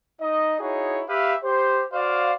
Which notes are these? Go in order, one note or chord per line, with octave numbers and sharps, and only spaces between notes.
D#4 D#5
D#4 E4 F#4 G#4 C#5
G4 B4 E5 F5
G4 C5
F#4 C5 D5 F5